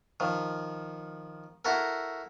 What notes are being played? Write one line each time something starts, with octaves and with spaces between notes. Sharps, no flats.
D#3 F3
E4 F#4 A4 A#4